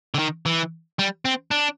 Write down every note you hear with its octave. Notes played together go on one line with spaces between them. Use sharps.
D3
D#3
E3
G3
C4
D4